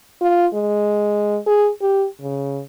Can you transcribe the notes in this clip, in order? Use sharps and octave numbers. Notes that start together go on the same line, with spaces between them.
F4
G#3
G#4
G4
C#3